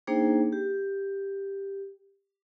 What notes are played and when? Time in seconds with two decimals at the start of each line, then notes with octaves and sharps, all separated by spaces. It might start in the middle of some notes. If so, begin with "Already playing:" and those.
0.07 A#3 D4 D#4 G#4 C5 G5
0.53 G4